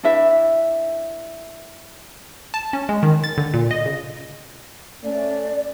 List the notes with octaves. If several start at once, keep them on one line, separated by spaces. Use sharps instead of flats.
D4 E4 B4 E5
A5
C#4
G#3
D#3
A6
D3
A#2
D#5
C#3
A3 C#4 D5